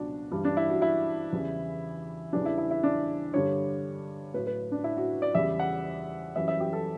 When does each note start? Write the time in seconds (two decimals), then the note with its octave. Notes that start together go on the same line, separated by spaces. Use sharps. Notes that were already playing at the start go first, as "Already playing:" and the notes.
Already playing: C#2 B2 F#3 D4 F#4
0.31 G2 E3 G3
0.45 D4
0.57 E4
0.69 F#4
0.82 E4
1.33 E2 C#3 E3 G3
2.33 E2 C#3 E3 G3 D4
2.46 E4
2.58 E4
2.71 E4
2.83 D4
3.34 G2 D3 G3 C#5
4.34 A2 F#3 B4
4.47 B4
4.72 D4
4.84 E4
4.97 F#4
5.22 D5
5.35 E2 C#3 G3 E5
5.60 F#5
6.35 F#2 E3 G3 E5
6.48 E5
6.60 G4
6.73 A4